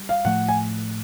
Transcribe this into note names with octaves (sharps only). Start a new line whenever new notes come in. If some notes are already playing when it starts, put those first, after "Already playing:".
Already playing: G3
F5
A2 F3 A3 F#5
G#5